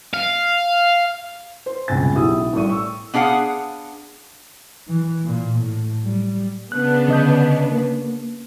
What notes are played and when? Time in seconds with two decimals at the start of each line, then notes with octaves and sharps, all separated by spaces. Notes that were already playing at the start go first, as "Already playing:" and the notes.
0.14 F5
1.66 C5
1.88 E1 C#2 G2 C3 G#5 A6
2.15 B1 E4 F#4 G4 D#6 E6
2.53 A1 G3 A3 D5 C#6 D#7
2.69 C#6 E6
3.14 B3 D4 G#4 F5 F#5
4.88 E3
5.25 A#2
5.58 A2
6.05 G3
6.72 C#3 B3 D4 F#6
7.08 D3 D#5 G6
7.72 A#3